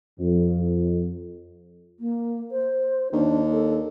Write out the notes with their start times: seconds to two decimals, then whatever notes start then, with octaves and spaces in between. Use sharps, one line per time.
0.20 F2
2.00 A#3
2.51 C5
3.12 D#2 D4
3.52 A4